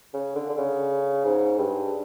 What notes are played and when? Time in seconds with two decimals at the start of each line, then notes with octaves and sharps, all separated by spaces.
0.14 C#3
0.35 D3
0.50 D3
0.58 C#3
1.25 G#2
1.58 G2